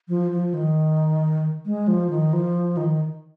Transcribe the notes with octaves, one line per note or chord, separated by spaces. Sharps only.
F3
F3
D#3
G#3
F3
D#3
F3
D#3